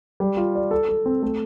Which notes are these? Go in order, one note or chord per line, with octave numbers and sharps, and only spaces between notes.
G3
F4
D5
A4
A4
C4
A3